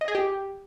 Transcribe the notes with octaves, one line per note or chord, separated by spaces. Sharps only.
D#5
G#4
G4